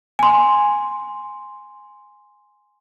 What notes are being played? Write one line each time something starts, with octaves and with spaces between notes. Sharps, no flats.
G#5 C6